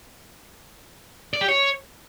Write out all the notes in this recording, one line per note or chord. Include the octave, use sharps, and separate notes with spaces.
D5
G4
C#5